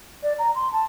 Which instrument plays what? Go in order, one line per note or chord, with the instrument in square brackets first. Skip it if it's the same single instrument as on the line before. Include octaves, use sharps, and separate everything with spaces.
[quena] D5
A#5
C6
A5